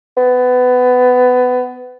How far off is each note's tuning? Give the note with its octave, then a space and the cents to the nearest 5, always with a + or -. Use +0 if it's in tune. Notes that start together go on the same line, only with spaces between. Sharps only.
B3 +20